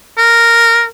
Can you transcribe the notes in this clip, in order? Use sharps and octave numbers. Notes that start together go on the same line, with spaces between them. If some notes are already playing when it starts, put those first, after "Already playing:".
A#4